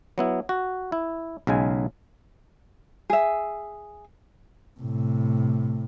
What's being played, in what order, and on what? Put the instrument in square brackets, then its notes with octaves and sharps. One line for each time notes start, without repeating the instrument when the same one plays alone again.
[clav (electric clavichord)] F#3 B3 E4
F#4
E4
B1 C#3 G#3 G#5
[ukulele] G#4 E5
[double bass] A2 C3